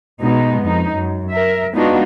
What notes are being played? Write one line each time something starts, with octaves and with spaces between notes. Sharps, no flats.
B2 G#3 B3 D#4
F2 D#4
F#2
A#4 E5
G#3 B3 D4 D#4 F4 F#4